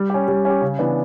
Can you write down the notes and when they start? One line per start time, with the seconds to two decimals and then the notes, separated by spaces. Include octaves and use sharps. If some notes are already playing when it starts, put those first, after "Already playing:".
Already playing: G3
0.10 C#4 G4
0.28 G3
0.45 C#4 G4
0.61 C#3
0.79 E3 B3 D4